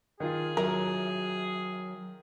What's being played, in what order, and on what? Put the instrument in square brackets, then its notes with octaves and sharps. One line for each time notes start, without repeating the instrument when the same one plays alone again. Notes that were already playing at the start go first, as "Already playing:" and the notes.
[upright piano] D#3 F4 [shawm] G#4
[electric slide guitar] F#3 E5 [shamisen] A#4